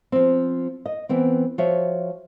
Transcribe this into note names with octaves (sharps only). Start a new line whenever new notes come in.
F3 C4
D#5
E3 B3 C4
F3 F#4 C#5 E5